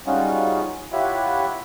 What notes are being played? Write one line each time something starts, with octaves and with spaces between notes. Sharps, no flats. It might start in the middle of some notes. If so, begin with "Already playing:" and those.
G3 G#3 C#4 D#4 F4 F#4
E4 F4 G4 C#5 E5 F#5